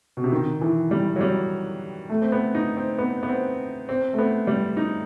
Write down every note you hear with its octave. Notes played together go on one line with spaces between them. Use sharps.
B2
C3
D#3
E3
G3
F#3
G3
A3
C4
B3
D#4
C4
B3
B3
C4
C4
A3
B3
G3
D#4